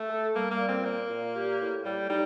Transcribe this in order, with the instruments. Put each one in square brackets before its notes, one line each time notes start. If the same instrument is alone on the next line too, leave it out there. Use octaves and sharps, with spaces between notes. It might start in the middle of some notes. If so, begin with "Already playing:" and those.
Already playing: [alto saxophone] A3
[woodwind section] A4
[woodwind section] G3 [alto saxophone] A#3
[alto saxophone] A#3
[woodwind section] A#2
[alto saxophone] C4
[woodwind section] A#2 [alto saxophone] A#3
[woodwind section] A#2
G4
A2
[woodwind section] A2 [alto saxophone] G3
[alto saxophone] G3 [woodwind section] D#4